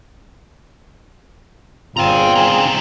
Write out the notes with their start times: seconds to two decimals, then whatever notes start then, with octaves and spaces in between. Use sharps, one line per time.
1.97 G1 A#2 C4 F4 G#4 G5 A#5
2.35 C3 D#3